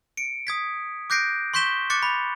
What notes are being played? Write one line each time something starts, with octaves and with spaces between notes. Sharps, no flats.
C#7 D7
D#6 G#6 B6
D6 F#6 G6 A#6 C7 D7
C6 C#6 G6 B6 E7 G7
D6 F#6 A6 C#7
B5